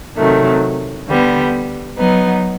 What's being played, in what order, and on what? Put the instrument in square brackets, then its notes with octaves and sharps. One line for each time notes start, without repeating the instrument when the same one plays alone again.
[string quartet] C3 D#3 F#3 A3
D3 G3 B3
F#3 B3 D#4